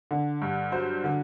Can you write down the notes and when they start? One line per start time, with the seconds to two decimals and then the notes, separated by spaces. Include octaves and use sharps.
0.11 D3
0.42 G2
0.72 F#3 C5
1.04 D3